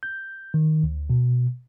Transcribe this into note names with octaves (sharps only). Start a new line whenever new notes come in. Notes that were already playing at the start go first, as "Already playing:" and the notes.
G6
D#3
D2
B2